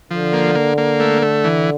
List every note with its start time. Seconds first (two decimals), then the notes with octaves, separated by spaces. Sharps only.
0.11 D3 F3
0.33 A#3
0.55 A#3
0.78 A#3
1.00 A3
1.22 A3
1.44 E3